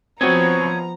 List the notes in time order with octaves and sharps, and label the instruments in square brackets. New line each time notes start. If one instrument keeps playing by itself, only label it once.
[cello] F3 B3 [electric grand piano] C4 F#4 [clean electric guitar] C#5 D#5 G#5 [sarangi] A#5